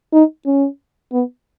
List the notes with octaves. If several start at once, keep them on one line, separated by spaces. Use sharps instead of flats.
D#4
C#4
B3